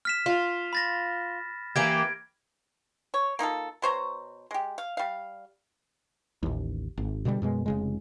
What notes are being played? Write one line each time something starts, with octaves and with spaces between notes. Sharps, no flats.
F6 B6 E7
F4
B5 A6 A#6
E3 A#3 G4 G#6 D7
C#5
A#3 D#4 F4 A4
B2 C5 C#5 A#5
G#3 G4
F5
G3 F5
A1 D#2
G#1
B2 D3 F3 G3
F#2 B2 G#3
F1 C#3 G#3